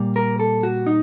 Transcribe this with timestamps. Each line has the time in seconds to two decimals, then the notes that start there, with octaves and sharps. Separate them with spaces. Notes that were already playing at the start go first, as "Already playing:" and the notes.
Already playing: A#2 G3 A#3
0.16 A#4
0.40 A4
0.63 F#4
0.87 D#4